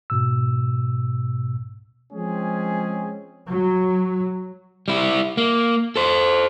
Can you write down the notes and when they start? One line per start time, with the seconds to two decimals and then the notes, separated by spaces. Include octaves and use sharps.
0.10 G#2 B2 E6
2.13 F3 G#3 C4 C#4 G#4
3.47 F#3
4.88 G3 E4
5.37 A#3
5.96 A4 C5